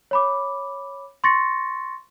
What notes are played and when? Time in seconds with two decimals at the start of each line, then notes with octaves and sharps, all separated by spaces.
0.11 C#5 B5 D6
1.24 C6 C#6 A6 A#6 C#7